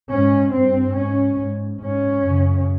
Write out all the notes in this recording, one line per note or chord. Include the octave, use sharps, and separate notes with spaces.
G#2 C#4
G2 C4
G#2 C#4
G#2
G#2 C#4
F#2 C#3